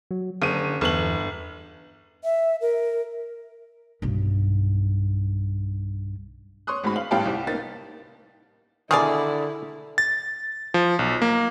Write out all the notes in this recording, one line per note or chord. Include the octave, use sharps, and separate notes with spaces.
F#3
F#1 D3 D#7
G1 E2 F#7
E5
A#4
B1 G2
C#5 C6 C#6 D#6 F#6
G#1 G#2 F#4 B5
F5 F#7
A1 G2 G4 F5 G5 A5
C2 G3
A#3 D#4 A6
B2 D3 D#3 E4 G#4 A#4 D5
A6
F3
B1
A#3